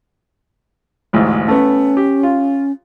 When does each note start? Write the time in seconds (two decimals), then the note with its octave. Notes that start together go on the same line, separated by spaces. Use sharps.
1.13 A1 D2 G#2
1.48 A3 B3 C#4
1.97 G4
2.23 F4